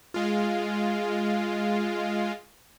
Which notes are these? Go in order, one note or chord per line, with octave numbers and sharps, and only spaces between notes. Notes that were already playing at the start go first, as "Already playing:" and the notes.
G#3 F4